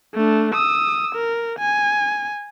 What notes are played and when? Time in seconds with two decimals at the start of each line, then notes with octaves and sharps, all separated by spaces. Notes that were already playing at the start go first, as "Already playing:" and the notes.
0.14 A3 D4
0.54 D#6 E6
1.15 A#4
1.59 G#5